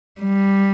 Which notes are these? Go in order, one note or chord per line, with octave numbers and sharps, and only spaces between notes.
G3